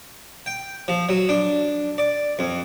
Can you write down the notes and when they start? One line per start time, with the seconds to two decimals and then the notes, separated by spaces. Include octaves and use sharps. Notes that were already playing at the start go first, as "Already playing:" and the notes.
0.46 G5
0.88 F3
1.09 F#3
1.29 D4
1.98 D5
2.39 F2